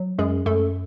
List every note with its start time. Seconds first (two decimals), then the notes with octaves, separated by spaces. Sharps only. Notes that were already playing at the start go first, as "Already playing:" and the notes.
Already playing: F#3
0.18 F#2 G#3 G#4
0.46 F#2 A3 A4